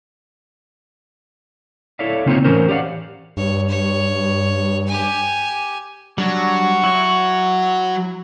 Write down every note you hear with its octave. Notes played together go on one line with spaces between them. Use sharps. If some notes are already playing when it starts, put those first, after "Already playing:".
E4 A4 C#5 D5 E5 F5
C#3 A#3 C4 D#4 F4 C#5
A2 E3 C#4 A#4 C5
G4 C#5 D5 F5 F#5
G2 C#5
C#5
G4 G#5
F#3 G3 D4 C#6
E4 F#4 C#5